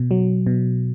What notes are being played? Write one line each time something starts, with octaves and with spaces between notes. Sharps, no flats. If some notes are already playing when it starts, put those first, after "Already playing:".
Already playing: B2
F#3
B2